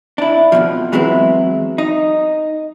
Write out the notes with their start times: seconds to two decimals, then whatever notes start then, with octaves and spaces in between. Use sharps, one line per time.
0.18 D4 E4
0.52 F2 G#2 B2 F3
0.92 E3 F#3 G#3 B3 C4 E4
1.78 D#4